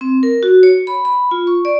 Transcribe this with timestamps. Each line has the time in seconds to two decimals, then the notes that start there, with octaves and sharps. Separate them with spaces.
0.01 C4
0.23 A#4
0.43 F#4
0.63 C#5
0.87 B5
1.05 B5
1.31 F4
1.47 C#6
1.65 D5